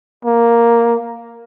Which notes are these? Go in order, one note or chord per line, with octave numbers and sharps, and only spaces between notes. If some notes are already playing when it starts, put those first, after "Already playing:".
A#3